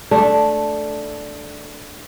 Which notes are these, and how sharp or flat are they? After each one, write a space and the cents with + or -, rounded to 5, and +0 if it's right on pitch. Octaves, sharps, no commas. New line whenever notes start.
A3 -5 D4 +0